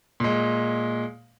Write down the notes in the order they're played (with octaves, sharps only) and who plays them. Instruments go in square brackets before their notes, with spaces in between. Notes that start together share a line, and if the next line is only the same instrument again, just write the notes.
[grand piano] A#2 G#3